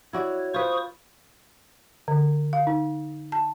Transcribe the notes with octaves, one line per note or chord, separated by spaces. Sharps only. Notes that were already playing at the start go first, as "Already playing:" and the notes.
E4 F#4 C#5 D5
F4 B4 C5 C#6 D#6
D3
F5
D#4
A5